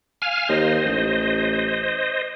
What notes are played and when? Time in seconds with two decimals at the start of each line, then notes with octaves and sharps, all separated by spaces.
0.22 F5 G#5 F6
0.49 D#2 C5 D#5
0.85 A1